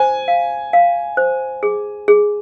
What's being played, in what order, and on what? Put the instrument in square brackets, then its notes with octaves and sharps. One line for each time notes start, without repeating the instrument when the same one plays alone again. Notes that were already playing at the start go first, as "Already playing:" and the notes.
Already playing: [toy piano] C5 [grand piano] G#5
[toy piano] F5
F5
C5
G#4
G#4